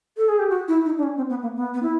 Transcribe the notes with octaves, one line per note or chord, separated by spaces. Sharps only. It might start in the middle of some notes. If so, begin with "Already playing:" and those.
A4
G#4
G4
F#4
E4
D#4
D4
C#4
C4
B3
A#3
B3
B3
E4